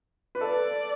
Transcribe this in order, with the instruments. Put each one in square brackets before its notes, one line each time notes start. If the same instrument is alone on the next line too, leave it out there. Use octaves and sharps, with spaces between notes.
[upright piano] B4
[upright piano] A4 [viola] D5